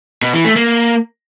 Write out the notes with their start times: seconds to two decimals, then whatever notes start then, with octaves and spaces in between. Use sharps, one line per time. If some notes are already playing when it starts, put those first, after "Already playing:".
0.22 B2
0.33 E3
0.45 A3
0.56 A#3